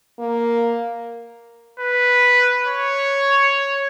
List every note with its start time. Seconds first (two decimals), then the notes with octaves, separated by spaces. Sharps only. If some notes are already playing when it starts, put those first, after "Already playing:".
0.20 A#3
1.80 B4
2.67 C#5